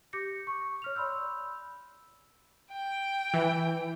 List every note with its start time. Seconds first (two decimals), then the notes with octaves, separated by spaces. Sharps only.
0.13 G4 D6 G6 A#6 C#7
0.47 C#6
0.82 C#5 F6 F7
0.95 D5 B5 C6 E6 G6
2.72 G5
3.34 E3